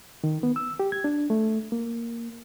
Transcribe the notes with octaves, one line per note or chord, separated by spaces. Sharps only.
D#3
B3
E6
G4
G#6
D4
A3
A#3